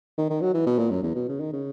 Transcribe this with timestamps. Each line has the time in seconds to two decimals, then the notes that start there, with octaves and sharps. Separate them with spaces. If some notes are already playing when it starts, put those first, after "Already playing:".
0.18 D#3
0.30 D#3
0.41 F#3
0.54 E3
0.66 B2
0.79 A#2
0.90 F#2
1.03 E2
1.15 B2
1.28 C#3
1.40 D#3
1.53 C#3